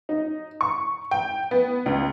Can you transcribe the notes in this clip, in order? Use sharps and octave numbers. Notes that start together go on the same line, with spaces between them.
D#4
C#6
G5
B3
C#2